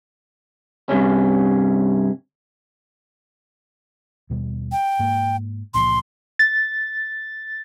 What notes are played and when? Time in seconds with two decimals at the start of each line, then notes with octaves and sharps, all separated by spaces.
0.89 G2 C3 C#4
4.30 D#2 B2 G3
4.72 G5
4.99 G#2 A#3
5.74 C#2 A#2 F3 C6
6.39 A6